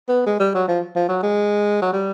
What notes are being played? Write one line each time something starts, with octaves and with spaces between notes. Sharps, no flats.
B3
G#3
G3
F#3
F3
F3
F#3
G#3
F#3
G3